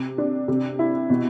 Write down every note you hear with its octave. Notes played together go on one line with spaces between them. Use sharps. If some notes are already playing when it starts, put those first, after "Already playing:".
Already playing: C3
D4
C3
E4
B2